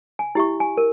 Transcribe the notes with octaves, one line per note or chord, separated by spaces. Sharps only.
G#5
E4 G4 E5 C#6
G#5
A#4